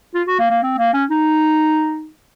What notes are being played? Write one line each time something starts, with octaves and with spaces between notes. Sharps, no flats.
F4
F#4
A#3
A#3
C4
A#3
C#4
D#4